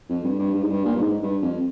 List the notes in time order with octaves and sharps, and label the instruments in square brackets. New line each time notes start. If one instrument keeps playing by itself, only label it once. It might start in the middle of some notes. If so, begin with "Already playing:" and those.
[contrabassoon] F2
G2
G2
G2
G#2
G2
A#2
G2
G#2
G2
F2